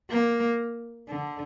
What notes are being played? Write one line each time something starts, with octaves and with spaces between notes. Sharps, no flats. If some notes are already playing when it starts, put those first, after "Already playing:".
A#3
D3